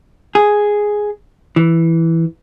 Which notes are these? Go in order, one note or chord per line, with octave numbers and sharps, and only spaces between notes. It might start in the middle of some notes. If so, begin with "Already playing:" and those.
G#4
E3